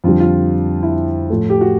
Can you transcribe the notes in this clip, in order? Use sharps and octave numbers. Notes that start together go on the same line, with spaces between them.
F2 D3 G3 F4
F4
E4
A2 F3 A3
G4
F#4